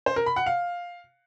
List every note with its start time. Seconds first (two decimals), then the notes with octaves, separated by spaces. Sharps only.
0.06 C5
0.16 A#4
0.26 B5
0.36 F#5
0.46 F5